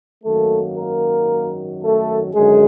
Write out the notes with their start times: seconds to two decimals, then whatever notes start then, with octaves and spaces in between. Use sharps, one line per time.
0.24 G#1 F#2 D#3 F#3 A3 A#3 A4
0.77 A#3 A#4
1.82 A3 A4
2.34 G#1 F#2 D3 G#3 G#4